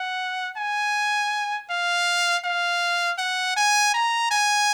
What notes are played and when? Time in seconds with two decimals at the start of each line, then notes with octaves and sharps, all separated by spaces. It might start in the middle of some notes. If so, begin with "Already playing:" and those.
Already playing: F#5
0.57 G#5
1.70 F5
2.44 F5
3.18 F#5
3.56 G#5
3.94 A#5
4.31 G#5